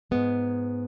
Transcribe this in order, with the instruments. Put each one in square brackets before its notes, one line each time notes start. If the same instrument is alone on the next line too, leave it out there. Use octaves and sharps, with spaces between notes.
[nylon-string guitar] G#2 G#3 B3